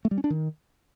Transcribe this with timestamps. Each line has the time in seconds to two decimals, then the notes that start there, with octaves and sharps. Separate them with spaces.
0.05 A3
0.11 G3
0.18 C#4
0.24 D4
0.30 D#3